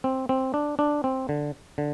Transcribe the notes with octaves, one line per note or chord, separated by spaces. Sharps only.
C4
C4
D4
D4
C4
D3
D3